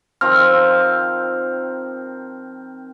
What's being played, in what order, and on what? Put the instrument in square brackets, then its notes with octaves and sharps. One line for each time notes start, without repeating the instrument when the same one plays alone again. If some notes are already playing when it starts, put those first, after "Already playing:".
[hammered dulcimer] D#3 F3 C4 [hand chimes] F6